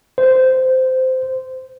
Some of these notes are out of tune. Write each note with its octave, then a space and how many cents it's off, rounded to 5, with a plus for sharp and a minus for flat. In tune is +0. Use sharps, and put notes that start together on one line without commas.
C5 -15